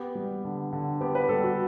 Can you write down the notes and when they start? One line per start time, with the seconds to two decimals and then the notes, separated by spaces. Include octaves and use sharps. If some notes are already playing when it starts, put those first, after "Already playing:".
Already playing: B3 G4
0.15 G3
0.44 D3
0.73 D3
1.01 B3 G4
1.15 B4
1.29 G3 A4
1.44 F#4